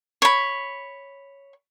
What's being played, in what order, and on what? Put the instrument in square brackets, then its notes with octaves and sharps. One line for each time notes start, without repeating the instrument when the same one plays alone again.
[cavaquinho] C#5 B5